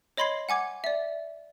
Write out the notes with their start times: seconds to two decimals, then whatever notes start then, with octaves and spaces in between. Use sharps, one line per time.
0.17 C#5 D#5 B5 C6 G#6 C7
0.49 F#5 G#5 D6 G#6
0.84 D5 E5